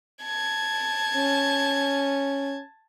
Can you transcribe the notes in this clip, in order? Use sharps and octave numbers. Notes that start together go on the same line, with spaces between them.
A5 G#6
C#4